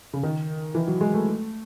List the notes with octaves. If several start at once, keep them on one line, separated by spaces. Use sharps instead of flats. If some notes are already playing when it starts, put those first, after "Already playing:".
C#3
D#3
E3
F#3
G#3
A3